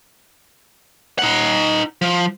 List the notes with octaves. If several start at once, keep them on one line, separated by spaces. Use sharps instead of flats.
D#4 F#5
F3